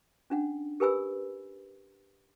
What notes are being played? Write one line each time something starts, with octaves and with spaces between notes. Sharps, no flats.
C#4 D4 F#5
G4 A#4 B4 G#5 B5 E6